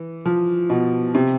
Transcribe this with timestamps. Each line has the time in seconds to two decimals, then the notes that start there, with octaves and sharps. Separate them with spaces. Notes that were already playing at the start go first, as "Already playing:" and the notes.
Already playing: E3
0.26 F3
0.70 B2
1.15 C3